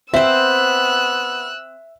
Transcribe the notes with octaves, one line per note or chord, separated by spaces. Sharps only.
B3 C4 C5 E5 E6 F#6